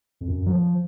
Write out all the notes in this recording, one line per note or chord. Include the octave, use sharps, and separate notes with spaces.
F2
F#2
F#3
F3